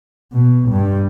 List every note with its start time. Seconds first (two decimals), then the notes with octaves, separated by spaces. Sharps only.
0.33 B2
0.70 G2